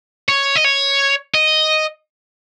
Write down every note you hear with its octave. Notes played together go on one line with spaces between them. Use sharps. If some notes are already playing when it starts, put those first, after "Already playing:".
C#5
D#5
C#5
D#5